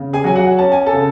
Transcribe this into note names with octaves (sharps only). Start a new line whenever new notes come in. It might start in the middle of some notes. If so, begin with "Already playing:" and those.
Already playing: C#3
G#4 G#5
F#3 G#5
F#4 F#5
C#4 A5
G#5
A4 A5
C#3